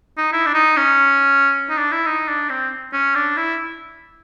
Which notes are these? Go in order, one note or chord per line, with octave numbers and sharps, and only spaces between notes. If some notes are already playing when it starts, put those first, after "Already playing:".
D#4
E4
D4
D#4
C#4
D#4
D4
E4
D#4
D4
C4
C#4
D4
E4